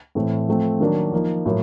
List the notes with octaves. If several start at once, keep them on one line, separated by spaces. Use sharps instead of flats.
A2 E3 A3 C4
F3 A3 C4
D#3 F#3 A#3 D4
F3 A#3 D#4
A2 F#3 A#3